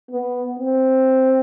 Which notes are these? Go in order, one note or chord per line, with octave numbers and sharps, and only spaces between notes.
B3
C4